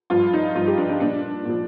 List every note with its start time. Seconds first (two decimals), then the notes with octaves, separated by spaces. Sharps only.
0.10 G2 F3 F4
0.34 D#4
0.55 G2 F3 F4
0.67 G4
0.78 D4
0.89 D4
1.00 A#2 F3 D4
1.45 A#2 F3